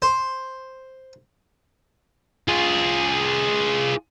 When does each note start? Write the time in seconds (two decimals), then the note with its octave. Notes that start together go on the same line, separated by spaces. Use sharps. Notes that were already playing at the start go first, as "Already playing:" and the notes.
0.02 C5
2.48 F4 G#4